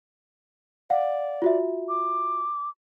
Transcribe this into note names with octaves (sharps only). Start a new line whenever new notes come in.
D5 F5 F#5
F4 F#4 E5
D6